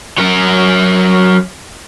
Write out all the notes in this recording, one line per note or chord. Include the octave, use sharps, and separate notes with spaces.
F#3 A#4